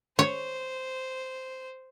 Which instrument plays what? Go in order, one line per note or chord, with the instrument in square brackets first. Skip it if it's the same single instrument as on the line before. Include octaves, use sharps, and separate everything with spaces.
[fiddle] C5 [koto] C#5